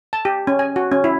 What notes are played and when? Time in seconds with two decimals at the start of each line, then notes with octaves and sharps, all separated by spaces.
0.13 A5
0.25 G4
0.47 C#4
0.59 G#5
0.76 F#4
0.92 C#4
1.04 E4